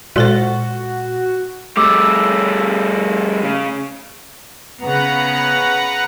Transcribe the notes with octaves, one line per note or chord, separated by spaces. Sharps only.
A#2 G#3 F#4 A4 C5
G3 A3 D6 E6
C#3
C#3 B3 B4 F#5 A#5